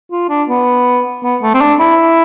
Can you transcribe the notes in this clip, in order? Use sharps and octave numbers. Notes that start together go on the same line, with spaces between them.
F4
D4
B3
B3
A3
C4
D4
E4